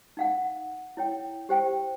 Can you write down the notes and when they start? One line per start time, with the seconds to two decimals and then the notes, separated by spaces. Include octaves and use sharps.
0.17 D#4 F5 F#5
0.97 E4 C#5 G5
1.49 G4 C5 G5